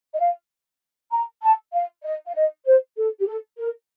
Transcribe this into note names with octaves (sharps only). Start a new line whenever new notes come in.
D#5
F5
A#5
A5
F5
D#5
F5
D#5
C5
A4
G4
A4
A#4